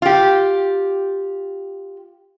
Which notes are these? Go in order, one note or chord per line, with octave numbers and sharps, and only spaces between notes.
F4 G4